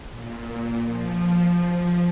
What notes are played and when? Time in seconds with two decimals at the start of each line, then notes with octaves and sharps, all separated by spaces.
0.11 A#2
0.86 F3